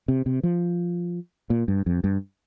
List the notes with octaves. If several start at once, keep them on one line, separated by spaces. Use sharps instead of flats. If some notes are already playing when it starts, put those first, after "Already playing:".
C3
C3
F3
A#2
G2
F2
G2